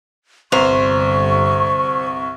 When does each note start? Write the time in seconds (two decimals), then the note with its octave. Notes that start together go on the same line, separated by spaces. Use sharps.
0.52 G1 C2 C5 A#5 C#6 F7